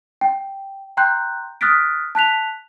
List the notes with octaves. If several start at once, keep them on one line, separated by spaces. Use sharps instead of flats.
G5
G5 A#5 C6 F#6 G6
D#6 F6 F#6 A6 B6 D7
A5 F#6 B6 F7